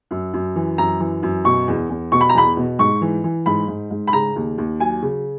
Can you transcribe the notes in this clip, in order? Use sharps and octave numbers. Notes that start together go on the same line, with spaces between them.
F#2
F#2
E3
F#2 A#5
E3
F#2
B2 C#6
E2
E2
B2 C#6
B5
A#5
E2 B5
B2
G#2 C#6
E3
E3
G#2 B5
G#2
G#2
B5
C#3 A#5
D#2
D#2
F#3 G#5
C#3